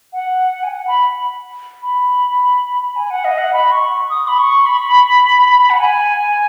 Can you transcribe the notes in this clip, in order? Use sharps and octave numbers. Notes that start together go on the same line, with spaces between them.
F#5
G#5
F#5
B5
B5
G#5
F#5
D#5
F#5
B5
C#6
D#6
B5
C#6
B5
F#5
G#5